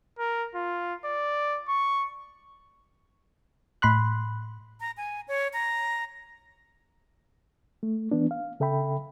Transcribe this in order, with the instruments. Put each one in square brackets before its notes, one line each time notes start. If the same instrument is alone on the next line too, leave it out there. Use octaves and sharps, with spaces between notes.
[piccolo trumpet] A#4
F4
D5
C#6
[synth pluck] A2 B5 C6 F#6
[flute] A#5
G#5
C#5
A#5
[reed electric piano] A3
E3 B3 D4
F5
C#3 A4 E5 G5 B5